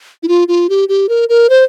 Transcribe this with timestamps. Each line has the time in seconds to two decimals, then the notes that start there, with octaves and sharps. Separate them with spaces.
0.23 E4
0.28 F4
0.48 F4
0.69 G4
0.89 G4
1.09 A#4
1.29 A#4
1.50 C5